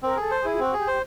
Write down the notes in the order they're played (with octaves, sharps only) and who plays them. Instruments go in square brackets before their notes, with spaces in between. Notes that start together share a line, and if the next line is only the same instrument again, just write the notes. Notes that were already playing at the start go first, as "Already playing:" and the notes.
[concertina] C4 [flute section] A#4
[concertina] G#4 [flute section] A4
[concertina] C5
[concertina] E4 [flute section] G#4
[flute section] F4
[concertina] C4 [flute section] F#4
[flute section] G4 [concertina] G#4
[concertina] C5